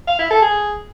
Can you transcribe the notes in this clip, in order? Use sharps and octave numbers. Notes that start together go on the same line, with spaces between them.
F5
E4
A4
G#4